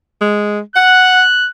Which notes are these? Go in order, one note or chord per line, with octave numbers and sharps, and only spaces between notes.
G#3
F#5 F#6